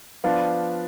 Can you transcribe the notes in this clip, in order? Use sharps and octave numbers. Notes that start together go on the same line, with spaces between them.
F3 B3 D4 F4